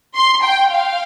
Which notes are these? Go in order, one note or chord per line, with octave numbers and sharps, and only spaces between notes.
C6
G5
F5